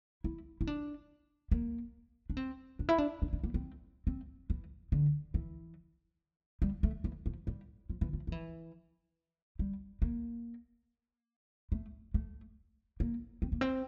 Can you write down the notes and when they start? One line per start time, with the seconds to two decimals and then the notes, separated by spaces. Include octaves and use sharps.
0.24 E4
0.61 E4
0.67 D4
1.51 A#3
2.30 D4
2.37 C4
2.79 D4
2.89 E4
2.98 D4
3.22 D4
3.33 D4
3.44 A#3
3.54 C4
4.07 C4
4.50 E3
4.92 D3
5.34 E3
6.62 G3
6.83 A3
7.04 E3
7.26 F3
7.47 G3
7.90 F3
8.01 E3
8.13 F3
8.27 F3
8.32 E3
9.59 G3
10.02 A#3
11.72 A3
12.14 A3
13.00 A#3
13.42 C4
13.52 A#3
13.61 C4